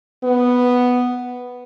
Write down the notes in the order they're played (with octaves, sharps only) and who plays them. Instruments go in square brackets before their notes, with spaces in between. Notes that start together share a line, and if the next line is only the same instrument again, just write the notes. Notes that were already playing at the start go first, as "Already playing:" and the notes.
[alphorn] B3